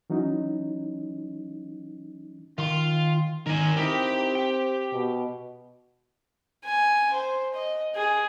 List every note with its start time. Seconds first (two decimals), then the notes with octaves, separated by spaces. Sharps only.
0.10 E3 F#3 C#4 D#4
2.58 D#3 F4 C6
3.46 D#3 A#4 G#5
3.77 C4 D#4 E4 G4 A#4
4.35 G5
4.93 B2
6.65 G#5
7.14 C5
7.54 D#5
7.96 G#4